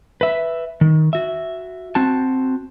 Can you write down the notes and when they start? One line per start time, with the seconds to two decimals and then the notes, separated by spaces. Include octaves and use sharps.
0.21 B4 E5
0.81 D#3
1.13 F#4 E5
1.95 C4 F#4 A5